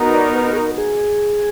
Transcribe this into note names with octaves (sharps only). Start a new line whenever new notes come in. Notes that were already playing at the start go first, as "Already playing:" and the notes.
Already playing: B3 D#4 F#4 A#4
D5
B4
G#4
A#4
G#4